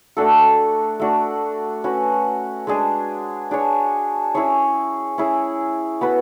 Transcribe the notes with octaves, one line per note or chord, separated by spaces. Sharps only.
A3 D4 F#4 A4
A3 D4 F#4
C#4 F#4 B4
G#3 D4 G#4
D4 G#4 C#5
C#4 E4 G#4 C#5
C#4 E4 G#4
B3 F#4 B4